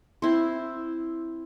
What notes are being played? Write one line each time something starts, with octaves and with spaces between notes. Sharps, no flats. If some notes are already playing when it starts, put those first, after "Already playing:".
C4 E4 C5